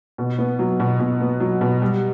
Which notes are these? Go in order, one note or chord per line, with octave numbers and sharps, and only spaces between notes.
B2
B3
F#3
B2
B2
B3
F#3
B2
G3